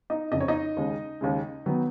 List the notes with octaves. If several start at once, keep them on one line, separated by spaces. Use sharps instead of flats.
D#4 D#5
F#1 F2 C#3 D#5
C#5
D#4 D#5
D#2 C#3 G#3
D#2 C#3 G#3
D#3 F#3 B3